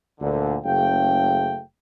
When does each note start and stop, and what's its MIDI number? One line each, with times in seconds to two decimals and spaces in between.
0.21 0.57 38
0.21 0.57 46
0.21 0.57 50
0.64 1.61 30
0.64 1.61 49
0.64 1.61 57
0.64 1.61 77
0.64 1.61 79